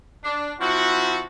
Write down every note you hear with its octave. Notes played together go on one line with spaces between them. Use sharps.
D4
F3 C4 E4 F#4